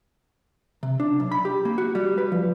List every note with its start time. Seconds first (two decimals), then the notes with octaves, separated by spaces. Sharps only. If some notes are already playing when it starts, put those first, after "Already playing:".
0.83 C3
1.00 D4
1.20 B1
1.32 B5
1.45 G4
1.65 A#3
1.78 F#4
1.95 G3
2.18 B4
2.32 F3